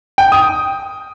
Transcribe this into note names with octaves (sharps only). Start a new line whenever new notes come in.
G5
D#6